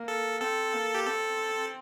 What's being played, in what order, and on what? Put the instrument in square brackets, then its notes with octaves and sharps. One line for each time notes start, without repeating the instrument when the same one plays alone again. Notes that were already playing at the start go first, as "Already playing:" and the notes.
Already playing: [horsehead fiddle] A#3
[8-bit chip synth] A4
[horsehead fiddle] C4 [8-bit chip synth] A4
[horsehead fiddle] A#3
[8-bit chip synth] G4
[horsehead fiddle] C4 [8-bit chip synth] A4